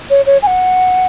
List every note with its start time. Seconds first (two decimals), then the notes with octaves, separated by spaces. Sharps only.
0.10 C#5
0.26 C#5
0.42 G#5
0.47 F#5